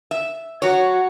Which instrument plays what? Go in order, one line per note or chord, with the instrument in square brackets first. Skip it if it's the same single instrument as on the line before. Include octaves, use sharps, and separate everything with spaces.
[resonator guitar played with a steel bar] E5
[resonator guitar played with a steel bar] F#3 C#5 [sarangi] F#4